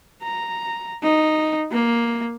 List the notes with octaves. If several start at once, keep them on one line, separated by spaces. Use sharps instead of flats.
A#5
D#4
A#3